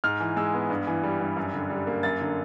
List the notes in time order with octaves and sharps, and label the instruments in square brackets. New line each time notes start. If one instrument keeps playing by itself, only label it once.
[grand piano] G#2 F6
E3
G#3 E6
B3
G2
E3
G3
G2
F#2
D3
G3
A#3
F#2 A6
D3